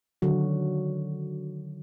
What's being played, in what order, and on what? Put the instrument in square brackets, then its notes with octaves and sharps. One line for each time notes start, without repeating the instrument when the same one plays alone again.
[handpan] D3 D#3 F#3 F#4